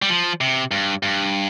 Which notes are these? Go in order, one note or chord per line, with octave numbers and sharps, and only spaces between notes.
G3
F3
C3
G2
G2